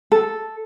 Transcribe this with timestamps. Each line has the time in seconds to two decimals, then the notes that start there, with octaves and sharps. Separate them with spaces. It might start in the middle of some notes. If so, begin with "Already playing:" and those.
0.12 A4